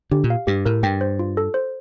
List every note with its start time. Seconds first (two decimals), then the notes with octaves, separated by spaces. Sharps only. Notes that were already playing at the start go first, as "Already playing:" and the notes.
0.11 D3 G4
0.24 A#2
0.30 F5
0.47 G2 G4
0.65 A2 A#4
0.83 G2 G5
1.01 C5
1.19 F4
1.37 A4
1.54 C5